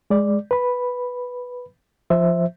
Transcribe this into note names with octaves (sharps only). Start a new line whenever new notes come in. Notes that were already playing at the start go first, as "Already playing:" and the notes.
G#3 D5
B4 B5
F3 C5 E5